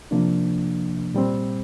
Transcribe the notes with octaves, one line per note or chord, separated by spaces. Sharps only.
C3 F3 A#3 D4
A#2 G3 C4